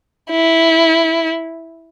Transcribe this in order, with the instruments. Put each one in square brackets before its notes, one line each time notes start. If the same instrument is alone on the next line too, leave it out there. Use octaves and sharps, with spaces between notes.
[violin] E4